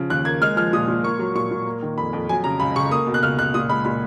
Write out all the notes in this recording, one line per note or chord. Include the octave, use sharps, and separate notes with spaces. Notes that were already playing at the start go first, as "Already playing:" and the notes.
Already playing: C#3 F3
D#2 F#6
A#3 G#6
G#3 F6
F3 F6
A#2 D#6
A#2
A#3 C#6
F#3
A#2 C#6
A#2
A#3
D#3
F2 B5
F2
F#3 G#5
C#3 A#5
C#2 B5
C#2 C#6
A#3 D#6
B2
F#6
C#2 F6
C#2 F#6
A#2 D#6
G#3 B5
A#2 B5